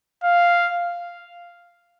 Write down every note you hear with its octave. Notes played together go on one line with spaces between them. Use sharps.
F5